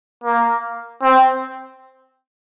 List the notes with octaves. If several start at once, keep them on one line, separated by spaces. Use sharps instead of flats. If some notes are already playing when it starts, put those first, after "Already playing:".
A#3
C4